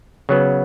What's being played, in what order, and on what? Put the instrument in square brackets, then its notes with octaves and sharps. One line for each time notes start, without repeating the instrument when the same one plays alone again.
[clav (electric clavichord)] C#3 F#3 B3